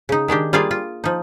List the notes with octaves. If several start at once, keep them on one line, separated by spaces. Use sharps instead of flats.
C#3 D#4
D#3 G#3 D4 G4
G3 A#3 F4 G#4 D5 F5
F4
F3 D#4